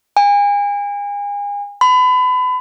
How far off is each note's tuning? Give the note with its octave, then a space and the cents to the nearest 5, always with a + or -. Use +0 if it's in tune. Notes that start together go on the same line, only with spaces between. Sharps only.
G#5 -35
B5 +30